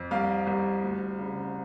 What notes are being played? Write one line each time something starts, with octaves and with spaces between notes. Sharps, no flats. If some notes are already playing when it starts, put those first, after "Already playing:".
Already playing: F2
C2 F5
C2
D2
C#3